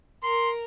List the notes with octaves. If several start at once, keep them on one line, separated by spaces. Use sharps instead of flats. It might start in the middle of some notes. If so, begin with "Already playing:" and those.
A#4 C6